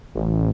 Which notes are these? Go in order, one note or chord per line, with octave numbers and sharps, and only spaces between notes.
A1